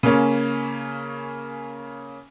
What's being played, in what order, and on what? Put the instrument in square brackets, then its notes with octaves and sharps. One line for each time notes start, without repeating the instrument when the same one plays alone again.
[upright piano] C#3 A#3 C#4